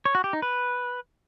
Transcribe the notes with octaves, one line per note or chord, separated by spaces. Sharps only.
C#5
F#4
G4
D#4
B4